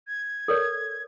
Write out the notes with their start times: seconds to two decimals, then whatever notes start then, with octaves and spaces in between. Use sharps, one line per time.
0.08 G#6
0.48 A4 A#4 C#5